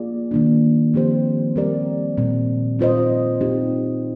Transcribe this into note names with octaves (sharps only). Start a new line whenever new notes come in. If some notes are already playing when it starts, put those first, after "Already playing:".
Already playing: A#3 F4 G#4 D5
D#3 A#3 D4
F3 C4 G4 C5
G3 C4 G4 A#4 D5
A#2 G3 C4
C4 F4 C5 D#5
C4 D#4 G4